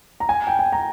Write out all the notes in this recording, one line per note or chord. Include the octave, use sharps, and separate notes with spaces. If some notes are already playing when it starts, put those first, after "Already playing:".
A#5
G#5
G5
G#5
A#5